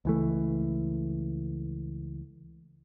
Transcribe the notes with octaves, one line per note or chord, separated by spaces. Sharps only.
C#2 E3 A3